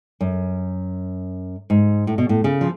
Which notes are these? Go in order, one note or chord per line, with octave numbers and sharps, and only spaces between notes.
F#2
G#2
A2
B2
A2
C#3
F3